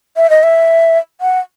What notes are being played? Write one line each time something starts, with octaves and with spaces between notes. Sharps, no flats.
E5
D#5
E5
F#5